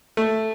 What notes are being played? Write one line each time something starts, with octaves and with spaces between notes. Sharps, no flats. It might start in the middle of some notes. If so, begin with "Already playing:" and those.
A3